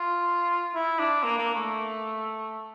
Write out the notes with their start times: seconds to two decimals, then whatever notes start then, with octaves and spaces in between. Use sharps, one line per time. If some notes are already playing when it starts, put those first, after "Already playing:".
Already playing: F4
0.75 E4
0.99 D4
1.23 A#3
1.39 A#3
1.54 A3